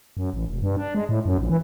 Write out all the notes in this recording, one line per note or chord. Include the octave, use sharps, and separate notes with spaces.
F#2
A1
E1
G2
D4
G#3
A2
F#2
A#1
E3